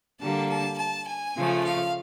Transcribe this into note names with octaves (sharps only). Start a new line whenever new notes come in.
D3 G3 A#3 A5
A5
A5
G#5
C#3 F3 A3
F5